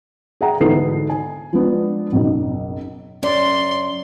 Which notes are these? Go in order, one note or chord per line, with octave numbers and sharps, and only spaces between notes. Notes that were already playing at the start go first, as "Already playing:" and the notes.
G#4 E5 F#5 G5 A#5
D2 G#2 E3 B3 A4 C7
G#5
F3 G#3 B3 D4
F#1 B1
F#2 C#4 D5 C6